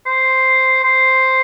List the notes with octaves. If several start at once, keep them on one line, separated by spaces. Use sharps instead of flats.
C5
C5